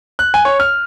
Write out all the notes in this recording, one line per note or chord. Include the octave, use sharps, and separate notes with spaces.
F#6
G#5
C#5
F6